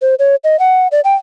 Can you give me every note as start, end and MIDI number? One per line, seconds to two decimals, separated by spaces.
0.02 0.15 72
0.19 0.35 73
0.44 0.59 75
0.59 0.87 78
0.92 1.00 74
1.04 1.15 79